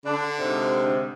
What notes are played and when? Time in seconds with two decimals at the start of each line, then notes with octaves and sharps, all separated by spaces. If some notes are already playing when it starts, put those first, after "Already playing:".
0.05 D3 D4
0.39 G#2 C3